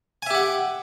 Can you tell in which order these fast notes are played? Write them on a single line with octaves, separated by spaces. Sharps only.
G#5 E5 G4 F#5